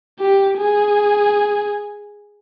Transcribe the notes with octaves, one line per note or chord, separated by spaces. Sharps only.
G4
G#4